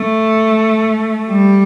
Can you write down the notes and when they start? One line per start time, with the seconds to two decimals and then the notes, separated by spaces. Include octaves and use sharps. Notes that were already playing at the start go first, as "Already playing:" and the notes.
Already playing: A3
1.29 G3